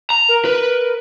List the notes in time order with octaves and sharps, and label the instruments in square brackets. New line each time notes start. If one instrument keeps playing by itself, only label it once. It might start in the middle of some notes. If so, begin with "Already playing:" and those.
[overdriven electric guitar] A#5
[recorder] A#4
[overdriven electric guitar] B4